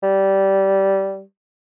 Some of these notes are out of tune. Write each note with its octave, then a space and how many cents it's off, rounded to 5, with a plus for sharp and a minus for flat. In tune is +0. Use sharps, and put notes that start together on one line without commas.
G3 -15